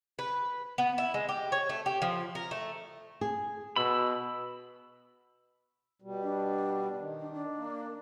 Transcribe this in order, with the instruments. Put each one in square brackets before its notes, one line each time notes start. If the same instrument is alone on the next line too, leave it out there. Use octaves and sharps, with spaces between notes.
[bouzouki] B4
B3
E4
G#3
G4
C#5
A3
G4
F3
A#4
A3
[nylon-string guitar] G#4
[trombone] B2 [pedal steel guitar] B5 E6
[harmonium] B2 G3
[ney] D4
[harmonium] D#3
[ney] D4
D4
[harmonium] A#3